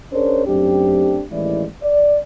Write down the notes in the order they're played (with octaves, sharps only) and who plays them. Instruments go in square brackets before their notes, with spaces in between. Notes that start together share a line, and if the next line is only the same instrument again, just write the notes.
[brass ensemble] C#4 D4 G#4 A#4 C5 C#5
F#2 A3 C4 D4 G4
A1 D#2 E3 G#3 E4 D5
D5